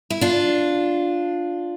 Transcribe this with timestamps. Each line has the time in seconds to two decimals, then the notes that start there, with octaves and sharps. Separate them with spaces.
0.10 E4
0.21 D4 F4